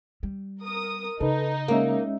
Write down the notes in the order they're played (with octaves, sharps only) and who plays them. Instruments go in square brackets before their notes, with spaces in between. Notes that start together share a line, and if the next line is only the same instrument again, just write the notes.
[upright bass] G3
[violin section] A#4 D#6
[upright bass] C#3 [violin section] D#4 [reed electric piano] A4 B4
[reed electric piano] G#3 C#4 E5 [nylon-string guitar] A#3